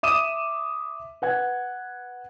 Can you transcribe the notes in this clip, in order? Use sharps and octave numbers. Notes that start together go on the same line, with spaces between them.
E5 D6 D#6 D#7 E7
B4 F#5 G#6